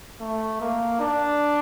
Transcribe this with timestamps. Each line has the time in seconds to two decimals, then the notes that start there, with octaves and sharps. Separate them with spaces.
0.20 A3
0.61 A#3
1.00 D4